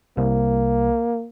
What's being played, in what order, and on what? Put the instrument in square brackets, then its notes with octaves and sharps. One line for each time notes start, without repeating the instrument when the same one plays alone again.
[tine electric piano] C2 [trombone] A#3